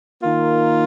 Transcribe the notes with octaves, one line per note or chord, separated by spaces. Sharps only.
D#3 A#3 F4